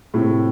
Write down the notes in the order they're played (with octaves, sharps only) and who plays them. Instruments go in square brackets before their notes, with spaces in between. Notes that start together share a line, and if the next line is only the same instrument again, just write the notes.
[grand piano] A2 C3